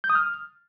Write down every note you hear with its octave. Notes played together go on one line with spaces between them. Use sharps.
G6
D#6
F6